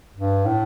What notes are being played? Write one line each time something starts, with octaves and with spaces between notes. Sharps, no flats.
G2
A2